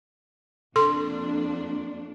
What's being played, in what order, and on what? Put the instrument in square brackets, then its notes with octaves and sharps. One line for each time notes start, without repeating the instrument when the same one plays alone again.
[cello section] F2 A#3 D4 [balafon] A4 C6